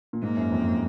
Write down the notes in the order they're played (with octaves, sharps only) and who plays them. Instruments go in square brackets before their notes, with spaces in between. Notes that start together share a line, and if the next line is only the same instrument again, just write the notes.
[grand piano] A#2
[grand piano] G#2 [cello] A#3
[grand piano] F#2
F2